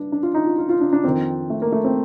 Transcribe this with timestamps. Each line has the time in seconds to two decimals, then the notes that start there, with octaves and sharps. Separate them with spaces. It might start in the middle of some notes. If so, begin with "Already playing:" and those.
Already playing: G2 D4
0.12 D4
0.23 F4
0.34 D#4
0.46 F4
0.58 F4
0.69 F4
0.81 D4
0.93 D4
1.04 F2 D#3 C4
1.50 A3
1.62 A#3
1.72 A3
1.85 C4